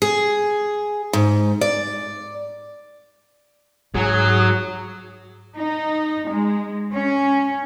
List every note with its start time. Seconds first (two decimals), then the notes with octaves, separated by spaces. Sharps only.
0.02 G#4
1.13 G#2
1.61 D5
3.95 G#2 F#3 G#4
5.56 D#4
6.30 G#3
6.92 C#4